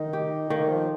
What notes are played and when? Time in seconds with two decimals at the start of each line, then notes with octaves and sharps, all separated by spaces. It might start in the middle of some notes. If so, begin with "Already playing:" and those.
Already playing: D#3 D#4
0.13 G4
0.50 D#3 A#3
0.69 F3